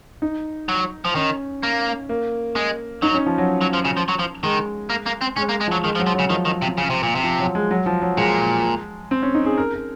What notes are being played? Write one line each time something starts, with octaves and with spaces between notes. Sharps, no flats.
D#4
F#3
F3
D#3 C#4
A#3
A#3
G#3
F#3 D#4
C#4
F3
F#3
F#3
F3
C#3
F3
F#3
F3
D#3 G#3
A#3
A#3
C4
G#3 C#4
A#3
G#3
F3 F#3
D#3 G#3
F3
F#3
F3
C#3 F#3
D#3 F3
D#3
C3
C#3
C3
A#2
C3
F3
F#3
G#3
F#3
F3
F#3
A#2 G#3
C4
C#4
D#4
G#4
A#4
A#4